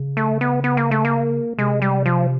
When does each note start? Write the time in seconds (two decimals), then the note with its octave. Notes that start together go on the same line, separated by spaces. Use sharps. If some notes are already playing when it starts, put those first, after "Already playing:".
Already playing: C#3
0.17 A3
0.41 B3
0.64 B3
0.77 A#3
0.91 A3
1.05 A#3
1.58 C3 G#3
1.82 G3
2.06 F3